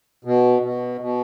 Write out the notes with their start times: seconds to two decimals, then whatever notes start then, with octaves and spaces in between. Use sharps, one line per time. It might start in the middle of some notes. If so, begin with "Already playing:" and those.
0.25 B2
0.62 B2
1.01 B2